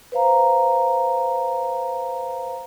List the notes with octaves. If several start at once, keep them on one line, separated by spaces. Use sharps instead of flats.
B4 C5 F5 A#5